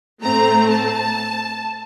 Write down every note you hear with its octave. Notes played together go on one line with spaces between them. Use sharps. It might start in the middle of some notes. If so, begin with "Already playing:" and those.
A2 A3 C4 A#5
A5